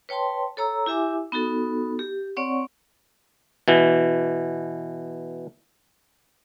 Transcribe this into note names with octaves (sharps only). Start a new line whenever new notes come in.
B4 C#5 G5 A5 C6
A4 C#5 A#5 E6
E4 G4 E5 G#5 D6
B3 D#4 F#4 A4
G4
C4 C#5 D5 F#5 C#6
B2 E3